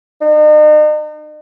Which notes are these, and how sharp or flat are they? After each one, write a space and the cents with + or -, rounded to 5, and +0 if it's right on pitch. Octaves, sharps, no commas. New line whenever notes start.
D#4 -40